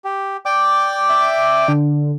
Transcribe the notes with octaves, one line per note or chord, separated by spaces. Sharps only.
G4
D5 G5 D6
E5
D3